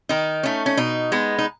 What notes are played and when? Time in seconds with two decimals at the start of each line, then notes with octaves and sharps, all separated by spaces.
0.09 D#3 D#4
0.43 A3 C#4
0.66 C#4
0.77 B2 D#4
1.12 G#3 B3
1.38 D#4